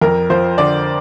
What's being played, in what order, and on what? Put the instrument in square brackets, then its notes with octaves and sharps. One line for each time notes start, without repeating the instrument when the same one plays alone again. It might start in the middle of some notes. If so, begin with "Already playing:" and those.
[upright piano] F2 A#4
F3 C5
D3 D5